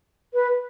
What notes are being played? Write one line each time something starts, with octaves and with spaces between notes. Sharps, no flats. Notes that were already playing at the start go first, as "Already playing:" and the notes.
B4